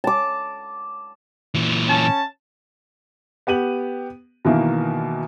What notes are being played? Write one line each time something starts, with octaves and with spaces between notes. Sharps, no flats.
A5 D6
A#2 E3
C#4 A5
B3 G4 D#7 F#7
B2 D#3 E3 A#3